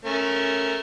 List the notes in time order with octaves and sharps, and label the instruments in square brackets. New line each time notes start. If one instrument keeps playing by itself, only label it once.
[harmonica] A3 C#4 A#4